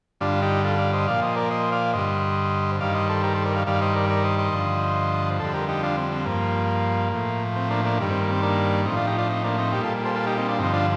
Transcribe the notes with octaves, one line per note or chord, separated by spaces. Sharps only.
G2 D3 G3 D4 F4
D#4 G4
F4 A4
D5 F5
C5 D#5
A#2 F3 D5 F5
C5 D#5
A#4 D5
C5 D#5
D5 F5
G2 D3 G3 C5 D#5
G2 D#3 G3 D5 F5
C5 D#5
A4 C5
G4 A#4
A4 C5
A#4 D5
D5 F5
G2 D#3 G3 D5 F5
C5 D#5
A#4 D5
A#4 D5
C5 D#5
C5 D#5
G2 D3 F3
F2 D3 G3 A4 C5
G4 A#4
D#4 G4
D4 F4
C4
C4
G2 F3 A#3
A2 F3
C4
A#3 D4
A#3 D4
G2 D#3 G3
C4
A#3
C4
A#3 D4
A2 F3 C4 D#4
D4 F4
D#4 G4
D4 F4
C4 D#4
A#3 D4
C4 D#4
A#2 G3 D#4 G4
F4 A4
A4 C5
F4 A4
D#4 G4
C4 D#4
D4 F4
G2 D3 F3 C4 D#4
D4 F4